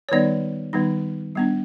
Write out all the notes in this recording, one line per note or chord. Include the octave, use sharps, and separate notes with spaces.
C#5
D#3 G3 B3 D#4 D5
D#3 G3 B3 D#4
G3 B3 D4